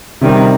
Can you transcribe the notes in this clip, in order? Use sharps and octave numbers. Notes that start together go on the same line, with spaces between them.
C3 D#3 G3 C4